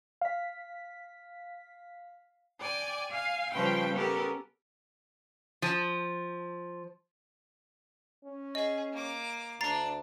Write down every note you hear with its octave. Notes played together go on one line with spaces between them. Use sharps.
F5 B6
D5 G5 G#5
F5 G#5
C#3 F3 G3 C#4 B4 G5
B3 C#4 G4 A4 A#4
F3
C#4
G#4 D#5
A#3 D6
D2 D4 A5 A#5 A6 C7